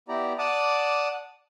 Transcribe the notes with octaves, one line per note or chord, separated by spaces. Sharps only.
B3 E4 G4 D5 A#5
D5 F#5 A5 D6 D#6